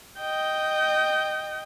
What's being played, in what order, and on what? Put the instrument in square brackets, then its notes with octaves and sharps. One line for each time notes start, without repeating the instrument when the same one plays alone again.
[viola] D#5 G5